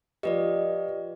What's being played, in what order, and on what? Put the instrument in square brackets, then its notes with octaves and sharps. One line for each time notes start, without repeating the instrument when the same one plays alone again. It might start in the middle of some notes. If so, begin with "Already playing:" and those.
[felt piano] F3 D#5 [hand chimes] G4 B4 D5